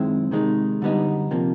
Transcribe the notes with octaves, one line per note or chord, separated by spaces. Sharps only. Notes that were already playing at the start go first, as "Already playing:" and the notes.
Already playing: F#2 D#3 G#3 C4 E4
C3 D#3 G#3 B3 D#4
F#2 D3 G3 B3 D#4
C3 F3 A#3